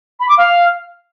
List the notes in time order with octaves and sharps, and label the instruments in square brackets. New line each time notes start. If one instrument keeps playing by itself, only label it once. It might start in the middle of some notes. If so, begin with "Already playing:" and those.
[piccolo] B5
D6
F5